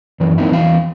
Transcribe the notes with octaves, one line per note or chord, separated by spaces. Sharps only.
F#2 E3
A#3 C4 D#4 E4
E2 E3 F5